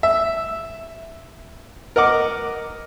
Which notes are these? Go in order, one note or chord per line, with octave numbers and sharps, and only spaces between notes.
E5
A#4 D#5 F#5 D6